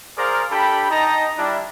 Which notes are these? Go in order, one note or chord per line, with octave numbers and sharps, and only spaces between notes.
G#4 A#4 C5 D5 F5 A#5
D4 G4 A4 G5 B5
D#4 D#5 G5 A5 A#5
G3 D4 E4